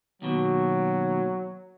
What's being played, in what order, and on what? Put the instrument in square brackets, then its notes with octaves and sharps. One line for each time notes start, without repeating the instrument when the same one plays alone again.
[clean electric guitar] D#2 B2 [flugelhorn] F#3